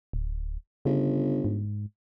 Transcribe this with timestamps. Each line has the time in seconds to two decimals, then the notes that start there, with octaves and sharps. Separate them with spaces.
0.13 D1
0.85 G1 C#3
1.45 G#2